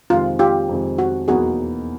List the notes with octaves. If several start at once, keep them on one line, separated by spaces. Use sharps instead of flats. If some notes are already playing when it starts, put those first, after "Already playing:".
F2 C3 D#3 G#3 F4
F4 G4
F2 C3 D#3 G#3
F#4
E2 B2 F#3 A#3 D#4 F#4 G#4